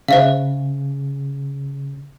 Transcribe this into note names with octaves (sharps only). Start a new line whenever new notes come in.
C#3 C5 E5 F5